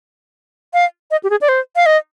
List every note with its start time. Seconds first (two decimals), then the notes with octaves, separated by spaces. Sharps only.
0.74 F5
1.11 D#5
1.24 G4
1.30 G#4
1.41 D5
1.49 C5
1.76 F5
1.86 D#5